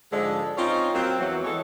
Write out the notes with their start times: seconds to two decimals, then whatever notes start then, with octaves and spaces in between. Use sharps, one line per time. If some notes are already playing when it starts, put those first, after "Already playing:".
0.12 G#2 D3 F3 G#3
0.58 C4 C#4 D#4 F4
0.94 F#3 A#3 C4
1.19 E2 E3 F#3
1.44 E3 G#3 A4 C#5